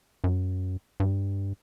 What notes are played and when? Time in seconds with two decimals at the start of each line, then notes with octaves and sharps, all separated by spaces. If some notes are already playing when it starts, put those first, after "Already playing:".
0.24 F#2
1.00 G2